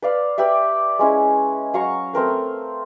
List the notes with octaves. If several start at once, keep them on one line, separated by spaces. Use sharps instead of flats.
B4 D5 F5
G4 B4 D5 E5
G#3 C#4 E4
F#3 F5 A#5 C#6
A3 C4 A#4 B4